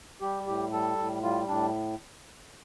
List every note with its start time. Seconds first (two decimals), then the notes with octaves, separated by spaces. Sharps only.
0.21 G3 G4
0.47 A2 G4
0.73 G3 A4
0.98 A2
1.23 G3 F4
1.48 A2 D4